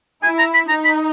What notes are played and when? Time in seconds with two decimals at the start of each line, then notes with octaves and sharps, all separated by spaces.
0.23 E4 G#5
0.39 A#5
0.54 B5
0.69 D#4 A#5
0.85 B5